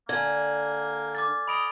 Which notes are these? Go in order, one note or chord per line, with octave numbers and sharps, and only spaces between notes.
D3 A#3 G#5 G#6
D6 F6 A6
D#5 B5 D7 F7